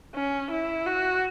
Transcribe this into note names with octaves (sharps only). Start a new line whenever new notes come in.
C#4
E4
F#4